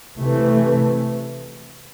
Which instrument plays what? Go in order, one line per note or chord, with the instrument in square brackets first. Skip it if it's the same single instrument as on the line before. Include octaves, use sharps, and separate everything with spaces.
[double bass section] C3 E3 A3